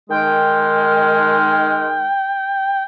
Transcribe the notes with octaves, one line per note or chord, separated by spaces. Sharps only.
D#3 G#3 G5 F6